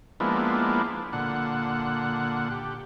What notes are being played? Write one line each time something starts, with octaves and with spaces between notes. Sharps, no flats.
F3 G#3 A#3 B3 D4 E4
A#2 D3 F#5
G4